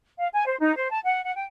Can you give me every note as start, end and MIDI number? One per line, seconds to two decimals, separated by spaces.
0.20 0.29 77
0.34 0.43 80
0.46 0.57 72
0.60 0.75 63
0.76 0.90 72
0.90 1.00 81
1.04 1.23 78
1.24 1.32 78
1.36 1.44 79